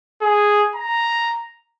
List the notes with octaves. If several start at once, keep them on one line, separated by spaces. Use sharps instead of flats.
G#4
A#5